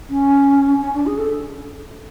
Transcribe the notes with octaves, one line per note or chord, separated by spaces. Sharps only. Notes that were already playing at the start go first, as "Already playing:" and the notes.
C#4
C#4
D4
G#4
A4